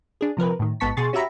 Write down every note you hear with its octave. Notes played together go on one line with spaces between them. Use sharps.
D4 G#4
C3 F3 A#4 B4
A2 D#3
A1 G#2 B3 A5 C#6 B6
B2 G#4 C6 C#6 A6
C#4 F#4 G4 E5 A#5 B5